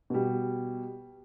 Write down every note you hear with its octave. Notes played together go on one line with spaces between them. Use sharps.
B2 G3